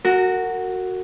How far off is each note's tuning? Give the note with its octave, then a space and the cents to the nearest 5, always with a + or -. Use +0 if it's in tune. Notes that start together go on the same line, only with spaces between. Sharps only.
F#4 +0 A#4 -30